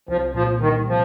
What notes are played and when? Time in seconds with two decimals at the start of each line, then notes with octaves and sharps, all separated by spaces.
0.08 C2 F3
0.34 A#2 F3
0.61 D#3 G3
0.88 C3 F3